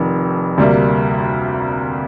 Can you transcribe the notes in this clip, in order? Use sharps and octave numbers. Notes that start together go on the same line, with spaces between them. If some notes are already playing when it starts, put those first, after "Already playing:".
Already playing: F1 F2 D#3
D2 C3 G3 A#3